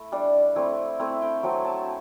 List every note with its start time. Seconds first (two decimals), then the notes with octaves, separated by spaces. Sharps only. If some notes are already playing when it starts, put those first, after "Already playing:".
Already playing: A3 E4
0.12 G3 D4
0.56 A3 C4 E4
0.99 A3 C4 E4
1.22 G5
1.43 F#3 A3 C4 A5
1.65 A5